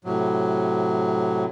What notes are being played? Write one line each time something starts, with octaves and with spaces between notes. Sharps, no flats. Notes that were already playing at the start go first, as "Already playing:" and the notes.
A2 C3 F#3